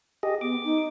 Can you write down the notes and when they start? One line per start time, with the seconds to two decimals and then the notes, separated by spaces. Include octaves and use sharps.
0.23 G4 G#4 D#5
0.41 B3 D6
0.64 D#4